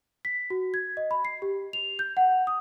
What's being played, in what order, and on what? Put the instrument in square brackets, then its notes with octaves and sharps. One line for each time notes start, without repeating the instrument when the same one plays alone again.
[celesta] B6
F#4
G#6
D#5
B5
C7
G4
F7
G6
F#5
D#6